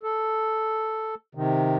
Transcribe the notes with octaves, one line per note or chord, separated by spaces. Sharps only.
A4
C3 D#3